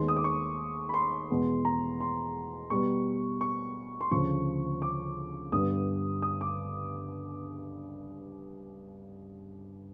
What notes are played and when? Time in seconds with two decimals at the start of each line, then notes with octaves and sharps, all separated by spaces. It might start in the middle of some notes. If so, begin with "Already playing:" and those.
Already playing: D#2 D#3 G#3 B3 C6
0.08 D#6
0.16 D6
0.24 C#6
0.89 B5
0.94 C6
1.30 E2 B2 G#3 B3
1.65 A#5
2.00 C6
2.70 B2 G3 B3 C#6
3.41 C#6
4.01 C6
4.11 D2 C#3 F3 C#6
4.82 D6
5.52 G2 D3 G3 B3 D#6
6.22 D#6
6.41 D6